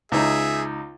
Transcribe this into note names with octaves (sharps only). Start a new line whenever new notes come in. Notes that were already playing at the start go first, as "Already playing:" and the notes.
C#2 D#4 G#4 E5